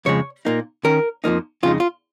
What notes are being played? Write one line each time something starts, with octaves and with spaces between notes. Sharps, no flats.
F2 C#3 F3 G#3 C#5
A#2 A#3 D#4
D#3 C#4 A#4
F2 F3 A#3 D#4
F2 C#3 G#3 D#4 F4
F4